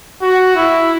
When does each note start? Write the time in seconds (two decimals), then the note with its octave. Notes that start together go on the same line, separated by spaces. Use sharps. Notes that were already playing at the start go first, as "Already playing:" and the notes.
0.22 F#4
0.56 E4